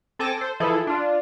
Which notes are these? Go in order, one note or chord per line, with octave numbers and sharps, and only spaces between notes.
C4 A4 G#5 A5 D6 A#6
A4 C5
E3 F3 E4 G#4 A4
D4 F4